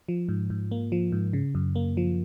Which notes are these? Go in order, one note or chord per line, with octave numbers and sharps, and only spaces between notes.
F3
G#2
G#2
A#3
F3
G#2
C#3
F#2
A#3
F3